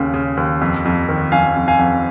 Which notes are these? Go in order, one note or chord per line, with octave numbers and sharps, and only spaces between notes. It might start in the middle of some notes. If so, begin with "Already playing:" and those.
Already playing: D#2 C#3
C#3
D#2
F2
F2
D#3
F2 F5 G#5
F2
F5 G#5
F2